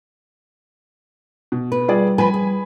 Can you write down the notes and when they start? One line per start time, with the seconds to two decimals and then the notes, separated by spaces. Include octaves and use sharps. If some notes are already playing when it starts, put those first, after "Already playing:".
1.52 B2
1.72 B4
1.88 G3 F4 G#4 D5
2.18 F3 B4 G#5 B5
2.34 G#4